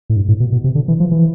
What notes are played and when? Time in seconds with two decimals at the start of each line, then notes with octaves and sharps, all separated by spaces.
0.10 A2
0.16 G2
0.29 A2
0.40 B2
0.52 B2
0.64 C3
0.75 D3
0.88 E3
1.00 F3
1.11 E3